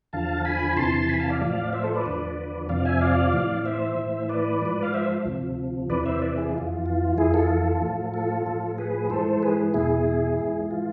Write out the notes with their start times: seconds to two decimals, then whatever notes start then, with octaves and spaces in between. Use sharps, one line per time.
0.13 E2 D3 F3 F5 A5
0.45 G#5 B5
0.77 E2 C3 E3 A5 C6
1.03 A5
1.09 G#5 B5
1.20 F5 A5
1.30 D5 F5
1.40 A2 F3 D5 F5
1.73 C5 E5
1.83 A4 C5
1.94 B4 D5
2.06 E2 D3 F3
2.69 F2 C3 F3 D5 F5
2.85 E5 G#5
3.01 D5 F5
3.33 A2 E3
3.65 C5 E5
3.97 A2 E3
4.29 B4 D5
4.62 G#2 F3
4.83 F5
4.94 C5 E5
5.25 D2 C3 F3
5.90 E2 C3 E3 B4 D5
6.06 C5 E5
6.22 B4 D5
6.38 E4 G#4
6.54 F2 E3 F4
6.86 F4
7.18 F2 E3 E4 G#4
7.34 F4 A4
7.82 A2 F3
8.14 F4 A4
8.46 A2 F3
8.78 G#4 B4
9.10 G#2 E3 A4 C5
9.43 G#4 B4
9.74 E2 B2 E4 G#4
10.38 G#2 E3
10.71 F4